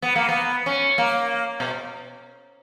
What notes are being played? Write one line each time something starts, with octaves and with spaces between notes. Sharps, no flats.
B3
A#3
B3
C#4
A#3
B2